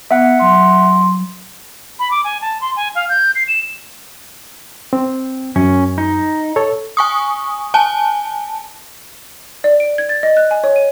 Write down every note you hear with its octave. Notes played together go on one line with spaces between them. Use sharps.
B3 E5 F#5
F#3 C6
B5
D6
G#5
A5
C6
G#5
F5
G6
C7
E7
C4
F#2 C#4
D#4
A4 C#5
G#5 C#6 D#6
G#5 A5
D5
D7
G#6
A6
D#5
F#6
G#5
C#5
D#7